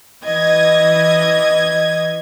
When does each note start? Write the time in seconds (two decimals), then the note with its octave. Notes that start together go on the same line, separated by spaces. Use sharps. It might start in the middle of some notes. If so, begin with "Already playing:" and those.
0.22 E3 D#5 G#6